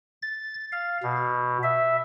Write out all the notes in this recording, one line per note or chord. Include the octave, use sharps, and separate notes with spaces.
A6
F5
B2
E5